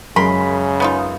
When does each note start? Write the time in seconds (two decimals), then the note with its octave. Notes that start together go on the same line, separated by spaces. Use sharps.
0.16 F#2 C#3 G#3 A#4 B5 C6
0.80 B3 D#4 F4